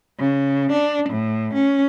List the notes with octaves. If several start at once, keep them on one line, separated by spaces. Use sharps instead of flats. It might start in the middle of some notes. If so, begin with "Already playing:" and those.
C#3
D4
A2
C#4